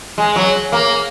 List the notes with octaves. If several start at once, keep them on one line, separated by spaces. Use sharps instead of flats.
G#3
F#3
A#3